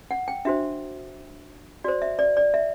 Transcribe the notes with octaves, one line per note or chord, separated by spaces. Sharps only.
F#5
G5
D4 F#4 C5 E5
F#4 C5 D5
E5
D5
D5
E5